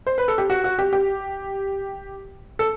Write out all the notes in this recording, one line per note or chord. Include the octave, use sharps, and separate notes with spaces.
C5
B4
A4
G4
F#4
F#4
G4
G4
A4